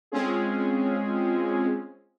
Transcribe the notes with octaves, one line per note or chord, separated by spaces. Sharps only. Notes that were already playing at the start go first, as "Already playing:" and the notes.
G#3 C4 C#4 F4 G#4